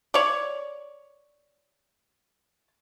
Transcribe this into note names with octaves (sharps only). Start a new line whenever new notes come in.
C#5 D5